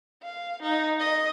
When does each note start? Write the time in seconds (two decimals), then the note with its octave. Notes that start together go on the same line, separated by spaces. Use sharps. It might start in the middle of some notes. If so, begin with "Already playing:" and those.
0.23 F5
0.62 D#4
1.00 D#5